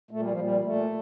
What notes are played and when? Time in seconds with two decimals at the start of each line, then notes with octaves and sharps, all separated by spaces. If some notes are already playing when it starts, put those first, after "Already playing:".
0.11 A#2 A3
0.20 G3
0.30 F3
0.37 A#2 G3
0.64 A#2 A3